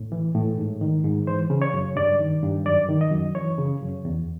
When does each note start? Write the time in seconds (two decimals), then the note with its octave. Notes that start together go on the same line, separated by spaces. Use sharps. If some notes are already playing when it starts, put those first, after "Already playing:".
Already playing: A2
0.12 E3
0.35 A2
0.58 G#2
0.81 D#3
1.04 G#2
1.27 E3 C5
1.50 C#3
1.62 C#5
1.74 F#2
1.96 G2 D5
2.19 D#3
2.43 G2
2.66 F#2 D5
2.88 D#3
3.01 D#5
3.11 F#2
3.35 E3 C#5
3.58 C#3
3.81 F#2
4.05 E2